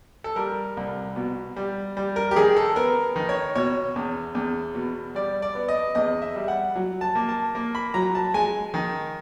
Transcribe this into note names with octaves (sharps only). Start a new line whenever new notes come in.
A4
G3 A#4
C2
B2
G3
G3
A#4
G4
D#3 G#4
A4
B3 A#4
D#3
C#5
B2 C#5
E2
E2
B2
G3 D5
D5
B3
D#5
E2 D#5
E5
G3
F#5
F#3
A5
A#3
A5
A#3
B5
F#3 A#5
A5
G#3 G#5
D#3